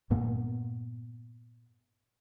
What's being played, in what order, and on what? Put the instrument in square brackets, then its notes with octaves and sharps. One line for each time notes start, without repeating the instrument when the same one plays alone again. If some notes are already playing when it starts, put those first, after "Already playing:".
[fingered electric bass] G2 A#2 A#3 B3